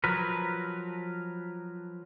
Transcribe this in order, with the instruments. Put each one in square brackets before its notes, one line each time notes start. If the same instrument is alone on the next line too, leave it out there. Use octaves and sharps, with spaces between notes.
[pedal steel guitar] F3 F#3 A#4 B4